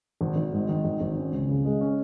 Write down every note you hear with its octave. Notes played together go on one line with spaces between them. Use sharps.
G#1
G#1
G#2
D#3
G#1
G#1
C#4
C#2
C#3
G#3
C#4